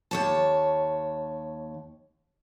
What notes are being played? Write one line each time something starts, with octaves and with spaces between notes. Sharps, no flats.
D#2 C#5 A5